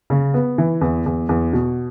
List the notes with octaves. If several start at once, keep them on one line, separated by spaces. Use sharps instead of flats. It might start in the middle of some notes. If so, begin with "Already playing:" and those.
C#3
B3
E3
E2
E2
E2
B2